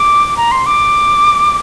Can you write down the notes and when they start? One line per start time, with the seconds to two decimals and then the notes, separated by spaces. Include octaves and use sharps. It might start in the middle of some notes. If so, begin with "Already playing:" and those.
Already playing: D6
0.37 A#5
0.52 C6
0.66 D6